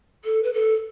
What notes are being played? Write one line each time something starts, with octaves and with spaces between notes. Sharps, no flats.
A4
B4
A4